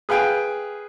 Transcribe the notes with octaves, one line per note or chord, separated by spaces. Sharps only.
G#4 B4 F5 G5 G#5